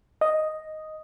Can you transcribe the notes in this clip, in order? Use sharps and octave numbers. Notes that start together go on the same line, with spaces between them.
D#5